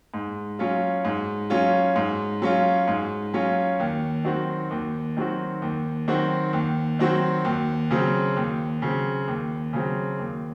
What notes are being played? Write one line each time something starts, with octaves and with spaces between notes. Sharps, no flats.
G#2
F#3 C#4 F4
G#2
F#3 C#4 F4
G#2
F#3 C#4 F4
G#2
F#3 C#4 F4
D#2
D#3 F#3 C4 F#4
D#2
D#3 F#3 C4 F#4
D#2
D#3 F#3 C4 F#4
D#2
D#3 F#3 C4 F#4
D#2
C#3 F#3 C4
D#2
C#3 F#3 C4
D#2
C#3 F#3 C4
D#2